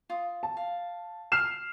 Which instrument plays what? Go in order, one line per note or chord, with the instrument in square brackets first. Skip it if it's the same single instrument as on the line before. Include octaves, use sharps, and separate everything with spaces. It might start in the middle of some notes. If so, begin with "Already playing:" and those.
[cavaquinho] F4 D#6
[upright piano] A5
[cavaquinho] F5
[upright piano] F6 C7 E7